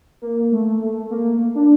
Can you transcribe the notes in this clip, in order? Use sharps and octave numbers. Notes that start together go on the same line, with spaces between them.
A#3
A3
A3
A#3
D4